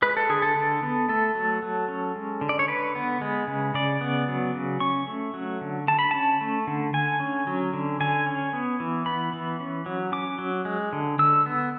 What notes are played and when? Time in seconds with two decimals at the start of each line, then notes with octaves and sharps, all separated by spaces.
0.02 G#3 B4
0.17 A4
0.29 D3 G#4
0.42 A4
0.56 D3
0.83 B3
1.09 A3 A4
1.35 F#3
1.62 F#3
1.88 C#4
2.16 G#3
2.41 D3
2.49 D5
2.59 C#5
2.68 D3 B4
2.95 B3
3.21 G#3
3.48 C#3
3.74 C#3 D5
4.01 B3
4.28 F#3
4.55 C#3
4.80 C#4 C#6
5.07 A3
5.34 F#3
5.61 D3
5.88 D3 A5
5.99 B5
6.11 C#4 A5
6.41 A3
6.67 D3
6.94 D3 G#5
7.20 C#4
7.47 F#3
7.74 D3
8.00 D3 G#5
8.26 C#4
8.53 B3
8.80 E3
9.06 B3 B5
9.33 E3
9.60 C#4
9.86 F#3
10.12 C#4 D6
10.39 F#3
10.65 G#3
10.93 D3
11.19 D3 E6
11.46 B3